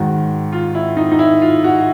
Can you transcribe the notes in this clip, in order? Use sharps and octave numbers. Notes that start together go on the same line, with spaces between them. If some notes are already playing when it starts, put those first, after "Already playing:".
Already playing: G#2 D#3 F#4
F4
E4
D#4
D#4
E4
F4
F#4